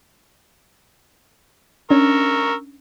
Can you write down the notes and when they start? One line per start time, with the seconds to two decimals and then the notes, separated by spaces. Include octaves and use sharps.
1.91 C#4 D4 A#4 C#6 E6